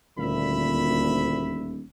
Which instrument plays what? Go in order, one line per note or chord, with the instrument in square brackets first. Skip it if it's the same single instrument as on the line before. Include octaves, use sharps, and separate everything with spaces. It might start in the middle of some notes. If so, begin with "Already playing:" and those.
[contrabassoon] D#1 [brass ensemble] D2 [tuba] A#2 [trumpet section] E5 B5